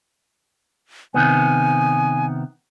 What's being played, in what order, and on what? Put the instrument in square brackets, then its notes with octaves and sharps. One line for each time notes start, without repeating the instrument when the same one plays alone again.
[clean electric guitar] C3 D#3 B3 [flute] G#5